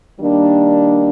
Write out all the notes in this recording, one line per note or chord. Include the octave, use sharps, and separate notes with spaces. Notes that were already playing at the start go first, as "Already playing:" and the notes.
D#3 G3 A#3 D4